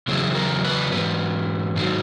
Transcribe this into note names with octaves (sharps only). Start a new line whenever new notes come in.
E2 C#3 F#3 B3 E4 G#4
A#4
B4
G#2 E3 B4
G#2 D#3 F#3